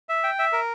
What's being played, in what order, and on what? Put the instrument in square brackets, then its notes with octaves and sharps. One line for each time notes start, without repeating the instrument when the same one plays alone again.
[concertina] E5
G5
E5
A#4